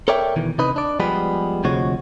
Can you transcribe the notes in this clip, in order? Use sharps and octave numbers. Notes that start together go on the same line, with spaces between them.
A4 A#4 C#5 D5 E5 G5
B2 D#3 E3
C3 D#4 B4 D#5
D4 D5
F3 G3 G#3 B3 G#4 B4
D2 C3 F3 G#3 F#4 C#5